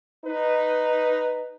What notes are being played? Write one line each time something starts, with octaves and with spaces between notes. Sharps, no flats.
D#4 B4